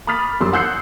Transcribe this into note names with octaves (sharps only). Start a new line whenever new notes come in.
B5 D6 D#6 F6 A6 B6
G1 F#2 G3 C6 D6 E6
F#5 E6 F#6 G6 C7 C#7